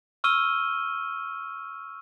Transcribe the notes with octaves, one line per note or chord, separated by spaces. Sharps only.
C#6 E6 F6 D#7 G7